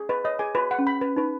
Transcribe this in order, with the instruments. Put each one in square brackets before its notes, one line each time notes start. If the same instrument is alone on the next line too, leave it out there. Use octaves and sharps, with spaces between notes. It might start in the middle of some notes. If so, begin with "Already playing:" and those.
Already playing: [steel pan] G#4
[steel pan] B4 [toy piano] D#5
[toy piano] C#5 [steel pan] D#5
[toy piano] G#4 [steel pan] G#5
[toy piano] F#4 [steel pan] B4
[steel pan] F#5
[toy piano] C#4
[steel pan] B5
B4
[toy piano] D#4 [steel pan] B4